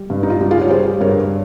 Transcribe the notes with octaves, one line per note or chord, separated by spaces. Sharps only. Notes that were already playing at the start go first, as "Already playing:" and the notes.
Already playing: G3
G2
D#4
F4
G3
F4 G#4
C#5
G3 G#4 C5
G2 A#4 C#5